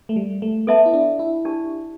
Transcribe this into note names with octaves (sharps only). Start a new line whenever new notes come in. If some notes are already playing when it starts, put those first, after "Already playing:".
A3
G3
A3
B3 A4 E5 A5
E4
D4
E4
D4 G4 D5 A5